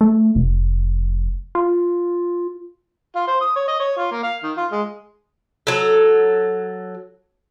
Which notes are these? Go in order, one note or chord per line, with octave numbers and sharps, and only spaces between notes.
A3
F1
F4
F4
C5
D#6
C#5
D#5
C#5
F4
A#3
F5
D#3
F4
G#3
F#3 A4